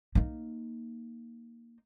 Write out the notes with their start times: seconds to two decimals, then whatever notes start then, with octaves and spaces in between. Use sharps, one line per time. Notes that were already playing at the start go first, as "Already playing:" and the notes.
0.15 A#3 D#4